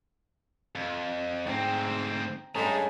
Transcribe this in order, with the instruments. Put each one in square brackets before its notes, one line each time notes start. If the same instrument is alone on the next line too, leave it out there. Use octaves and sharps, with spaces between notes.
[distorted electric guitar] F2
[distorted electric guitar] D2 C4 [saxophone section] G#2 [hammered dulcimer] G5 A#5
[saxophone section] G2 G#3 A3 [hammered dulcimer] C#4 [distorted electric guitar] G#4 A#5